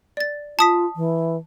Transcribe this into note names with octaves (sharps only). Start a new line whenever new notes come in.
D5 A6
F4 A5 D#6 B6
E3